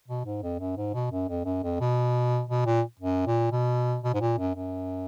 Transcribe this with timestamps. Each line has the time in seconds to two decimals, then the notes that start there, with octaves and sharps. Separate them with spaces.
0.08 B2
0.25 G#2
0.43 F2
0.60 F#2
0.77 G#2
0.94 B2
1.11 F#2
1.28 F2
1.45 F#2
1.63 F2
1.80 B2
2.49 B2
2.66 A#2
3.00 F#2
3.27 A#2
3.52 B2
4.03 B2
4.14 G#2
4.21 A#2
4.38 F#2
4.55 F#2